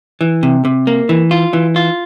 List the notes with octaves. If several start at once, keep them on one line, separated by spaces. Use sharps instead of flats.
E3
C3
C3
A#3
E3
F4
E3
F4